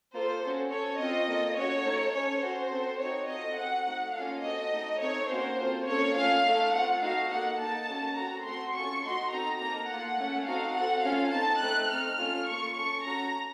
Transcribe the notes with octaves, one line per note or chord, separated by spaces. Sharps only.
A#3 F4 A4 C5
C#4 F#4 A4
C#4 A4 C#5
C4 F4 A4 D#5
A#3 F4 A4
C#4 F#4 A4 C#5
A3 D#4 A4
C#4 A4 C#5
C#4 F#4 A4 C5
C4 F#4 A4
C4 D#4 F#4 C#5
C4 F4 A4 D#5
C4 F#4 A4 F#5
A3 D#4 F#4
A#3 C#4 F4 A4 F5
C4 F#4 A4 D#5
A3 D#4 A4
C4 D#4 A4 C#5
A#3 C#4 F#4 C5
C4 F4 A4
A#3 C#4 A4 C#5
A3 C#4 F4 F5
A3 D#4 A4
A3 C4 F4 A4 F#5
A3 D#4 F#4 A4 F5
A#3 D#4 A4 F#5
A#3 D#4 A4 A5
A#3 C#4 F#4 A4
C4 F#4 A4 A#5
A3 C4 F#4 C6
C#4 F4 A4 C#6
A3 D#4 F#4 C6
C4 D#4 F#4 A4 A#5
A#3 D#4 A4 A#5
A#3 F4 A4 F#5
A3 C#4 A4
C4 D#4 F#4 A4 F5
C4 F#4 A4 F#5
A3 C#4 F4 A4 F5
C4 D#4 A4 A5
A3 C4 D#4 A4 F#6
A3 C4 D#4 A4 F6
A3 C#4 F4 A4
A#3 F4 A4 C#6
C#4 A4 C#6
A3 C#4 F#4 A4 A#5